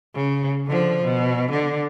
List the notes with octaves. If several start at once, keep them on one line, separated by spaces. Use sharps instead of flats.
C#3
D3 F3
B2
D3